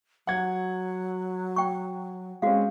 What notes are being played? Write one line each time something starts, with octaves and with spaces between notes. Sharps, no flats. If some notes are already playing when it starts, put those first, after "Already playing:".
F#3 F#5 G#6
G5 C#6
G#3 C4 C#4 F#4 F5